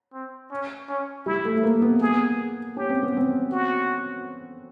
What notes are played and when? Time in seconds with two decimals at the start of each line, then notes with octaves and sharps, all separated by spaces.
0.13 C4
0.51 C#4
0.89 C#4
1.26 G3 E4
1.45 A3
1.56 A3
1.63 A#3
1.82 B3
1.95 A#3
2.01 G#4
2.09 B3
2.77 C#4 G4
2.89 C4
3.03 B3
3.17 C4
3.52 F#4